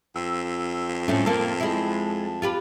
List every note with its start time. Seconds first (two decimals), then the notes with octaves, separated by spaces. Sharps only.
0.16 F2 E6
1.08 A2 A3 C#4
1.26 A#3 C4 A4 A5
1.60 G#3 E4
2.42 F4 G4 B4